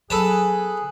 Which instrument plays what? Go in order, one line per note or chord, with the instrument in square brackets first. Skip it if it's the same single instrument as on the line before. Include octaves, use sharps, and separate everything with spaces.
[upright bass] F#3 B3 [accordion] G#4 F#6 [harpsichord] A4 B4 A5